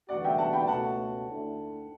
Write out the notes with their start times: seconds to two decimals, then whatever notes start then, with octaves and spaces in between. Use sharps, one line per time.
0.09 E2 D3 G3 B3 F#4 D5 F#5
0.24 E5 G5
0.38 F#5 A5
0.53 G5 B5
0.67 C#2 B2 A3 C#4 F#4 F#5 A5
1.27 D2 D3 A3 E4